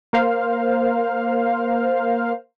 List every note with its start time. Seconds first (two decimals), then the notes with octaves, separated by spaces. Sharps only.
0.13 A#3 A#4 C5 F5